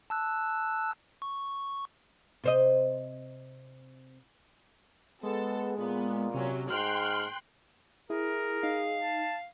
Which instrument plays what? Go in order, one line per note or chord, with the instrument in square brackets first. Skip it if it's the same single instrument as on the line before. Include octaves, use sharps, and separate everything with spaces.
[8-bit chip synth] A5 E6 F#6
C#6
[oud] C3 C5 D#5
[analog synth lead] G#3 [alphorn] B3 [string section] A4
[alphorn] A#2 [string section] B3
[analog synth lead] C3 [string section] F#3 C#4
[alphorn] G#2 [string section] G5 C6 F#6 [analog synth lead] F6
[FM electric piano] E4 [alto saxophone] G#4 [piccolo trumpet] A#4
[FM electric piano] D#4 [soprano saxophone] F5
[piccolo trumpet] A5